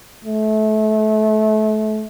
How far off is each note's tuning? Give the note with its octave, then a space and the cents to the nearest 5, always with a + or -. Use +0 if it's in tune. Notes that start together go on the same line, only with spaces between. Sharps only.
A3 -30